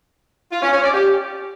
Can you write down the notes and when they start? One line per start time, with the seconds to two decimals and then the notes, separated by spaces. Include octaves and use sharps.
0.52 F4
0.63 C#4
0.73 C#4
0.83 D5
0.94 G4